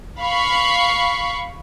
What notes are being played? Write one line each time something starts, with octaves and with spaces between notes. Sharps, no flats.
F5 B5 C#6